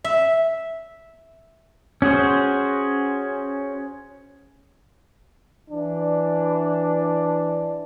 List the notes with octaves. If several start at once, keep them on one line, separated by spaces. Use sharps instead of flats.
E5
C#4 F#4 G#4 C5
E3 D4